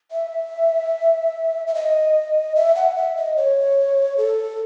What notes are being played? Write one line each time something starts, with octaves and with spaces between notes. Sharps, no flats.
E5
E5
D#5
E5
F#5
E5
D#5
C#5
A4